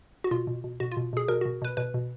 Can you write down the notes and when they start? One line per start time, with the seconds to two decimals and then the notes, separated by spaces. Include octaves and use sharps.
0.24 F#4
0.31 B2 F4
0.47 B2
0.64 B2
0.80 B2 F#4
0.91 F4
0.97 B2
1.13 B2 G#4
1.28 B2 A#4
1.41 B2 F#4
1.62 B2 B4
1.77 B2 B4
1.94 B2